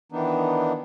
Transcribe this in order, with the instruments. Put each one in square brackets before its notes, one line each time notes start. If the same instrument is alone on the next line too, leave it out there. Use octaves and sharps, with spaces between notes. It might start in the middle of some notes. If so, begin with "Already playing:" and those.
[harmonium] D#3 E3 B3 D4 D#4